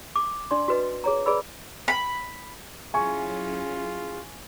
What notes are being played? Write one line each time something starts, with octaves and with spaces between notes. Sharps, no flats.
D6
D4 D5 C6
F#4 B4 D#5
G#4 C#5 A#5
G#4 B4 D5 B5 E6
B5
F#3 C#4 E4 F4 G#4 G#5 C#6